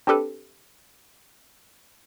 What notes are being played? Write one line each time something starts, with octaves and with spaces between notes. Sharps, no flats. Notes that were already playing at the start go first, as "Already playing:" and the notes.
C4 D4 G4 A4 B4